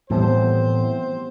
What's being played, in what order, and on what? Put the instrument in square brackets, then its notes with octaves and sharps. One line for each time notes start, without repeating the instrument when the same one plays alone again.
[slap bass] A2 E3 F3 [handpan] G3 B3 [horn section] C4 C5